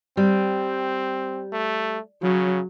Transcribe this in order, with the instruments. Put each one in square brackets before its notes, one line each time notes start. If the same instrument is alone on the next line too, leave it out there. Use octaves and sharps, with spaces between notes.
[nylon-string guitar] G3 [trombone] C4
[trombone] A3
[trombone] C#3 [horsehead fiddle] F#3